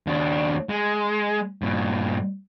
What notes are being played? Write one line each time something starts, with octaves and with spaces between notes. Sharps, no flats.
D#2 D4
G#3
G2 A#2